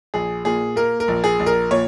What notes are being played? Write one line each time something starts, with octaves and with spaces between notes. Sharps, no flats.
A#1 G#4
A#2 G#4
A#3 A#4
A#4
A#1
G#4
A#1
A#4
A#2 C#5